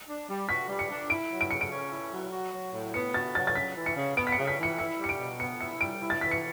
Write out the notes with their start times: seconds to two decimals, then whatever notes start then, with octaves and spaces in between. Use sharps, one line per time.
0.08 D4
0.28 G3
0.49 F#4 B6
0.69 G3
0.79 C#7
0.90 D4
1.10 E4 D7
1.30 F#3
1.41 D7
1.51 C#3 C#7
1.61 D7
1.72 C#4
1.92 E4
2.12 F#3
2.32 F#4
2.53 F#3
2.73 A2
2.94 B3 C#7
3.14 F#4 A6
3.35 F#3 A6
3.47 A6
3.55 C#3 B6
3.76 E3
3.86 C#7
3.96 C#3
4.17 B3 D7
4.27 B6
4.32 C#7
4.38 C#3
4.47 B6
4.58 E3 C#7
4.78 E4 C#7
4.99 G3
5.04 C#7
5.09 D7
5.19 B2
5.39 B3 C#7
5.60 E4 C#7
5.81 G3 D7
6.01 E4
6.10 A6
6.21 E3 B6
6.31 C#7